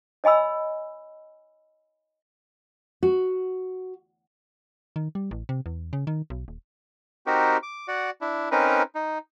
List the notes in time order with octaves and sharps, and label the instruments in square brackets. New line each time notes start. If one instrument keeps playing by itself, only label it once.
[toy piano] C#5 D#5 G#5 B5 E6
[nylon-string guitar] F#4
[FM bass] D#3
G3
A1
C3
E2
C#3
D#3
B1
D#1
[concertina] C4 D#4 F#4 G4 A#4
D6
F#4 D5 F#5
D4 E4
C4 C#4 D#4 A#4 B4
D#4